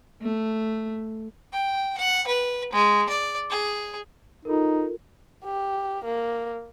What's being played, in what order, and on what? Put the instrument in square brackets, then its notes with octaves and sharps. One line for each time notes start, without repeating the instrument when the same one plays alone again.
[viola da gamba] A3
[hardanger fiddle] G5
F#5
B4
G#3
D5
G#4
[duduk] D#4 [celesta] F4 A4 A#4
[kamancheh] G4
A#3